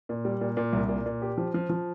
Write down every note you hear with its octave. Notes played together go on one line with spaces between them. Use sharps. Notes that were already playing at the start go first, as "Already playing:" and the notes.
A#2
G3
A#2
A#2
C2
A#2
A#2
G4
F3
F3
F3